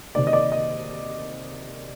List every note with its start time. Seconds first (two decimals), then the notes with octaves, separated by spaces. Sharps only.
0.15 C3 D#3 A#3 D5
0.27 D#5
0.33 D5
0.52 D#5